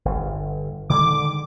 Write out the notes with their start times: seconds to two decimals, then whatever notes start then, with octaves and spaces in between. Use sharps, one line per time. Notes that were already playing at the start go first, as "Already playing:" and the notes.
0.05 G1
0.90 D3 D#3 G#3 D6